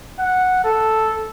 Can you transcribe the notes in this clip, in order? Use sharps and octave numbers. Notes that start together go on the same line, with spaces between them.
F#5
A4